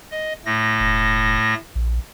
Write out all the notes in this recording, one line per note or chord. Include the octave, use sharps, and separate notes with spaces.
D#5
A2 A3 A#6
E1
A#1